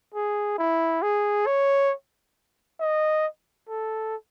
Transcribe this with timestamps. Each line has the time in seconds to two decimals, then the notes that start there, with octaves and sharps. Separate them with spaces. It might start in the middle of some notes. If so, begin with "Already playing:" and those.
0.14 G#4
0.58 E4
1.02 G#4
1.47 C#5
2.80 D#5
3.69 A4